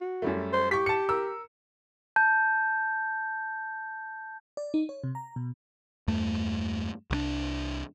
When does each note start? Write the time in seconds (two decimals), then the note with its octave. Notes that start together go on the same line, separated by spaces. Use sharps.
0.01 F#4
0.22 F#2 G3 A3
0.53 C5
0.71 G4 C#6 B6
0.86 A5 C#7
1.09 A#4 E6
2.16 A5 G6
4.57 D5
4.74 D#4
4.89 C#5
5.04 C3
5.15 A#5
5.36 B2
6.08 E2 G2 A3
7.11 C2 E3 D4